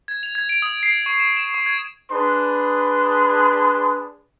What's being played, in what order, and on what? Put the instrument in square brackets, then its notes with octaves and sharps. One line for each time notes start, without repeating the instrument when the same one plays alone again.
[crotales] G#6
F7
G#6
D7
D#6
C7
C#6
E7
E7
C#6
G#6
[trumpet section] D4 G#4 B4 C6